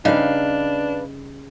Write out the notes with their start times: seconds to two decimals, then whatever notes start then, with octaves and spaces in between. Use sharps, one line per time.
0.05 C#3 G3 D4 D#4 B4 F5